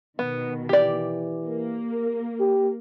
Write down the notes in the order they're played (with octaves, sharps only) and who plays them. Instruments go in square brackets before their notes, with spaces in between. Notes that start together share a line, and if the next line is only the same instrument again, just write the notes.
[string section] B2 D#3 [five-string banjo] B3
[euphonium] E3 [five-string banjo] G4 D5
[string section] A#3
[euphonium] G4